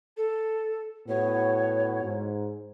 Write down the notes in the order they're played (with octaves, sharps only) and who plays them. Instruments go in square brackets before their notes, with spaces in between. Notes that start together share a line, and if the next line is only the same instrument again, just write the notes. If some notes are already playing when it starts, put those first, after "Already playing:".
[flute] A4
[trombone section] A2 B3 F#4 [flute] C#5
[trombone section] G#2